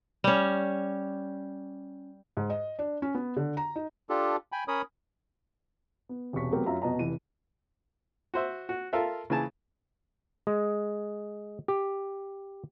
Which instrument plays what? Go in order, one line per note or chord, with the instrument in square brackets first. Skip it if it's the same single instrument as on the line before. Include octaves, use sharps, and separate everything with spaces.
[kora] G3 C#4
[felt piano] G#2
D#5
D4
C#4
B3
D3
A#5
D#4
[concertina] D4 F4 G4 A4
G5 G#5 B5
C#4 A#4 C#5 B5 D#6
[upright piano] B3
E1 C2 C#4 C#6 B6
F#3 A3 B3 C4 G4 A#4
F#2 F4 E5 A#5
F1 B2 B4 D#5 A5 A#5
F1 E3 D#7
[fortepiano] F#4 C5 E5
F#4
F4 A4 A#4 E5
C#3 E3 G#5 A5
[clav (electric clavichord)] G#3
G4